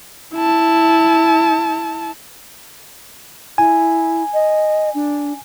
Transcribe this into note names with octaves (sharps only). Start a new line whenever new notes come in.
E4 A5
E4 G#5
D#5
D4